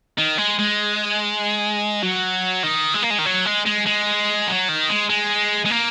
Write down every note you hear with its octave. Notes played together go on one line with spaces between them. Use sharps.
D#3
G#3
G#3
F#3
D#3
G#3
A#3
G#3
D#3
F#3
G#3
G#3
G#3
F#3
D#3
G#3
G#3
G#3
A#3